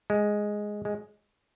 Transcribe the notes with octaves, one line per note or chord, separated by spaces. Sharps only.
G#3
G#3